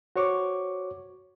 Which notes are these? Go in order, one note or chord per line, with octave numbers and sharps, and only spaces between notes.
F#4 C5 C#5 C#6 D6